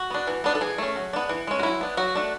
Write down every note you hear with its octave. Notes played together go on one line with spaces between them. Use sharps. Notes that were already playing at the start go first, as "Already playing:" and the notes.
Already playing: F#4
B3 D4
E3
B3 D4
A4
E3 G#4
A3 C#4
F#3
B3 D4
E3
G#3 C#4
F#4
F#3 E4
B3 D4
F#3 F#4
A3 D4